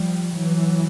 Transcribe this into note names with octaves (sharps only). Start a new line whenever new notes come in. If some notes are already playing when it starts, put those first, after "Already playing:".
Already playing: F3 G3
E3 F#3